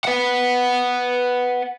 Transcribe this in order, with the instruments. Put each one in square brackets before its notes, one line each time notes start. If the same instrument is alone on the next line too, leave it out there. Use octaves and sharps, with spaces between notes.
[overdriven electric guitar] B4 F#5